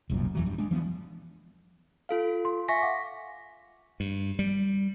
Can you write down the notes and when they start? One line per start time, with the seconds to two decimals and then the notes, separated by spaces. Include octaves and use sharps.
0.10 E1 C2 F#2 A#2
0.35 E2 E3 F#3
0.46 G2
0.58 G#3 D4
0.71 E3 F3 B3
2.09 F4 A4 F5
2.45 C6
2.68 E5 G#5 C#6 A#6 B6
2.82 F5 F#5 D6
4.00 G2
4.39 G3